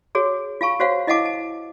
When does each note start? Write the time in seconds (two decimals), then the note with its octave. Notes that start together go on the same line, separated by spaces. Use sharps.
0.15 F#4 G#4 C#5
0.61 F4 F5 A5 C#6
0.80 F#4 C5 C#5 F5 F#5
1.07 E4 D#5 F5 F#5 A5 D6
1.26 A5